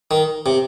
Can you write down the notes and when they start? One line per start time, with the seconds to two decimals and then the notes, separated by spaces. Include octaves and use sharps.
0.11 D#3
0.46 C3